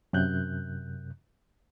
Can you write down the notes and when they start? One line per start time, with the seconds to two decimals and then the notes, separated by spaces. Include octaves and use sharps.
0.13 F#2 C3 F#6 G6